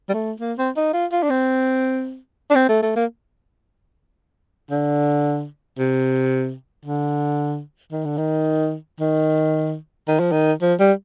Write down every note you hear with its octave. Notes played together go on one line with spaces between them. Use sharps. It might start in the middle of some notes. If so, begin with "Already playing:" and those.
G3
A3
A#3
C4
D#4
F4
F4
D4
C4
D4
C4
A3
A3
A#3
D3
C3
D3
D#3
D3
D#3
D#3
D#3
F3
D#3
F3
G3